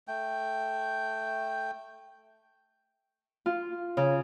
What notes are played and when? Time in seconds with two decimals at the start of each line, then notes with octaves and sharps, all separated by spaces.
0.08 A3 G5
3.46 F4
3.97 C#3